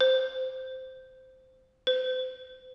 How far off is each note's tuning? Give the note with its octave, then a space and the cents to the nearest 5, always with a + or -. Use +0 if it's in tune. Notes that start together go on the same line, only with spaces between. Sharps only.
C5 -10
C5 -35